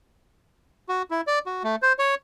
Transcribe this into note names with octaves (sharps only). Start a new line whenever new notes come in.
F#4
E4
D5
F#4
A3
C5
C#5